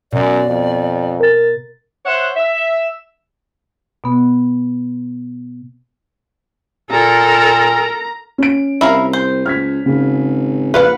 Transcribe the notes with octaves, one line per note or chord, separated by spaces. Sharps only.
F#2 B2 D5
F2
A#4 A6
C5 C#5 E5 F#5
E5
B2 B3
A#2 A4 A#4 A#5
C#4 D7
C2 E4 A#4 F5
C5
C#2 F6 G#6 B6
G#1 C#3
A#1 F4 B4 F5 F#5